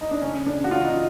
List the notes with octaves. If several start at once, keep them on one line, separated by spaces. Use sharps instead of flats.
D#4
D4
C#3 C#4
C#3 D4
F#4
C#3 F4
D#4